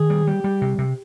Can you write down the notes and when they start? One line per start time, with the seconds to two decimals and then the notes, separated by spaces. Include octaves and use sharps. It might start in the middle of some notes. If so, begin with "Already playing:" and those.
Already playing: D#3 G#4
0.10 G3
0.27 G3 G4
0.44 G3
0.61 C3
0.78 C3